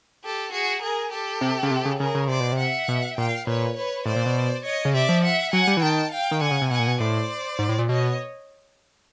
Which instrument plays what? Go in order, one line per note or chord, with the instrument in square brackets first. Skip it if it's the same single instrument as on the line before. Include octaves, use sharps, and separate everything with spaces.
[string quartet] G4 A4
F#4 G#4
G#4 A#4
G4 A4
[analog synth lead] C3
C#3
C3
C#3
[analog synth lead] C#3 [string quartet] G#4 A#4
[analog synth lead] C#3
[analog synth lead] C3 [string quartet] C5 D5
[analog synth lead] B2
C3
[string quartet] E5 F#5
[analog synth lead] B2
[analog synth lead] A#2 [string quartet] F5 G5
[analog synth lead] A#2 [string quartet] B4 C#5
[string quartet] B4 C#5
[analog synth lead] A2 [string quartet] C5 D5
[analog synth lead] A#2
B2
[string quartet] C#5 D#5
[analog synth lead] C#3
[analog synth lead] C3 [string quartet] D5 E5
[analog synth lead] F3
[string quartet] E5 F#5
[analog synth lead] F#3 [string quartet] F#5 G#5
[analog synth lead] G3
E3
[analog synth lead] D#3 [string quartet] G5 A5
[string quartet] F5 G5
[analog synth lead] D#3
[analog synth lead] D3 [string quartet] F#5 G#5
[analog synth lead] C#3
C3
[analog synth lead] B2 [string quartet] F#5 G#5
[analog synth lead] A#2
B2
[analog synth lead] A2 [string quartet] C5 D5
[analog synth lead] G#2
A2
A#2
[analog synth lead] B2 [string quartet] C#5 D#5